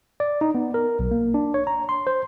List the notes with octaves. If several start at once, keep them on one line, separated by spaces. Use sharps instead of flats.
D5
D#4
B3
A#4
B1
A#3
D4
C#5
A#5
C6
C5